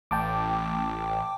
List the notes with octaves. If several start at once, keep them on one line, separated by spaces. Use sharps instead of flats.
A1 G5 A5 D6